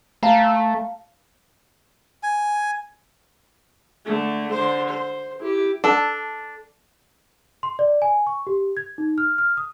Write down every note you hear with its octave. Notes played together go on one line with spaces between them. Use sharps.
A3 F5 A5 A#5
G#5
D3 A3
D3 C5
C5
E4 G4
D4 A4
C6
D5
G#5
C#6
G4
G#6
D#4
F6
F6
D#6